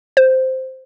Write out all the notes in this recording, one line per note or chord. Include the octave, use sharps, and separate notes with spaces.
C5